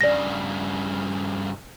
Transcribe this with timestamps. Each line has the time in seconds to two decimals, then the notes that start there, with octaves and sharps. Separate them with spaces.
0.01 G2 C#3 D5 A#6